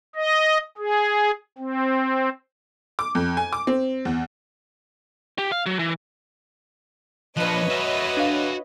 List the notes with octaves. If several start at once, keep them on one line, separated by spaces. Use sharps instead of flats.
D#5
G#4
C4
D6
F2
G#5
D6
C4
E2
G4
F5
F#3
E3
F3 D4 B4 C#5 D#5 F#6 C#7
F#4 E5
D4 F5